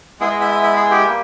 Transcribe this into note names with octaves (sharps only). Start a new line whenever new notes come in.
G#3 B3 E4 G#4
D#5
E5
E5
E5
G#4
G4
G3 A#3